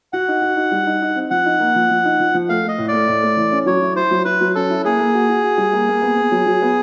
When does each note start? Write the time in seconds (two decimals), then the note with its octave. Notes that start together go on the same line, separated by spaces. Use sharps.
0.13 F#4 F#5
0.28 D#4
0.42 F#4
0.57 D#4
0.72 G3
0.87 D#4
1.02 D#4
1.16 C4
1.30 F3 F#5
1.46 D#4
1.60 A#3
1.75 F3
1.90 F3
2.05 D#4
2.19 F3
2.34 F3
2.49 A3 F5
2.64 A3 D#5
2.78 A2
2.88 A3 D5
3.08 A2
3.23 A3
3.37 E3
3.52 C#4
3.66 F#3 C#5
3.82 E4
3.96 E4 C5
4.11 F#3
4.25 E4 B4
4.41 F#3
4.55 C#4 A4
4.70 E4
4.85 A#3 G#4
4.99 A#3
5.15 F#4
5.29 F#4
5.43 F#4
5.58 G3
5.73 A#3
5.88 A#3
6.02 B3
6.17 B3
6.31 F#3
6.46 F#3
6.62 B3